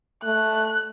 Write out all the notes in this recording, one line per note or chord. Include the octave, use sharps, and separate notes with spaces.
A3 F#6